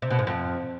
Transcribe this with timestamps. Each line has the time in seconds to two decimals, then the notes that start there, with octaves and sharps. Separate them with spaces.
0.02 C3
0.11 B2
0.19 G#2
0.27 F2